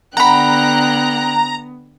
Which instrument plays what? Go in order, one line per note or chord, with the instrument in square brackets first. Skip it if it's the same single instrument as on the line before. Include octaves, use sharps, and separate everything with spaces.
[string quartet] D3 G5 F#6 [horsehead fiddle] B3 [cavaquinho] F#5 B5 [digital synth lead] A#5